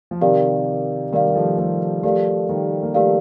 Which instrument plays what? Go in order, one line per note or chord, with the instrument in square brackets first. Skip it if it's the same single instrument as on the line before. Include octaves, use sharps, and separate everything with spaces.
[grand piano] F3
[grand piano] C3 D#3 [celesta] G4 A#4 D5 F5
[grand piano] D#3 G3 [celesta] G4 A#4 D5 F5
[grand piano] G3
F3 A3
F3 A3
[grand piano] F3 A3 [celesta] G4 A#4 D5 F5
[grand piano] D#3 G3
A#3
[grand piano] F3 A3 [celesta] G4 A#4 D5 F5